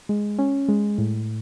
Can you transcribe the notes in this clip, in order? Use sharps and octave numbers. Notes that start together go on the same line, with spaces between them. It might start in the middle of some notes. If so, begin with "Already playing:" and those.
G#3
C#4
G#3
A2